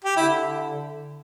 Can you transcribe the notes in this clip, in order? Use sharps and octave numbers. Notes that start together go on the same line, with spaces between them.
G4
D3 E4